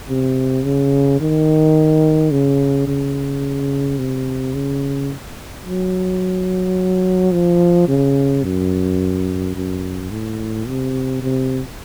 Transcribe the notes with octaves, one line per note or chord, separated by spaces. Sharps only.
C3
C#3
D#3
C#3
C#3
C3
C#3
F#3
F3
C#3
F#2
F#2
A2
C3
C3